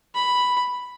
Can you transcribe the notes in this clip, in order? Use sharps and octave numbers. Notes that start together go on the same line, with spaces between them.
B5